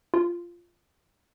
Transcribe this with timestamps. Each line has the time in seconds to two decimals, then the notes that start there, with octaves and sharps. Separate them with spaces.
0.14 F4